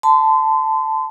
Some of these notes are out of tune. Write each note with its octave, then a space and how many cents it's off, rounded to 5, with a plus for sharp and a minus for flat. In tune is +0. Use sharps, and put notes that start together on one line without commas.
A5 +0 C6 -35